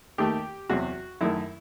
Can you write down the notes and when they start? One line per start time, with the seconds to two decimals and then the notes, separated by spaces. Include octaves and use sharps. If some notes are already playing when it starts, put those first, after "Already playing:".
0.18 D#2 D#3 A3 G4
0.70 E2 C3 F#3 F#4
1.21 F#2 D#3 A3 E4